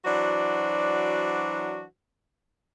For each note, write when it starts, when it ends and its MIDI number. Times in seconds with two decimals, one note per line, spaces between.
0.05 1.82 52
0.05 1.82 54
0.05 1.82 62
0.05 1.82 66
0.05 1.82 72
0.05 1.82 74